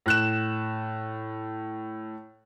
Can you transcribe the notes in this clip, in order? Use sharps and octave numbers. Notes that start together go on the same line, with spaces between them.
A2 F#6 E7